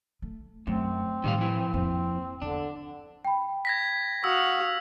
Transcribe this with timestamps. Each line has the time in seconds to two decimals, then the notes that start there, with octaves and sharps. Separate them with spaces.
0.22 A3
0.67 F#2 A3 C4
1.24 A2 D#3 G3 F5
1.39 F3 E4
1.74 F2 A#3 C4
2.42 E2 D3 D4
3.25 G5 B5
3.65 G#6 A#6 B6
4.24 F#4 F5 D#6 E6